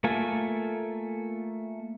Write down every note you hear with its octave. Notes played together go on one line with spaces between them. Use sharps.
A3 A#3 F4 A4 G#5